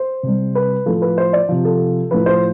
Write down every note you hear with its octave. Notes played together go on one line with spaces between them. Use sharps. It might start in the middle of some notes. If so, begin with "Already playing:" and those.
Already playing: C5
C3 G3
B4
A2 F3 A4
B4
C5
D5
C3 F3
A4
A2 F3 B4
C5